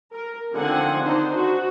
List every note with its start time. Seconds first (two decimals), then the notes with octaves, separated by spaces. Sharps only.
0.13 A#4
0.54 D3 D#3 F3 C4 F#5 G#5
1.03 D4 D#4 C5
1.36 F#4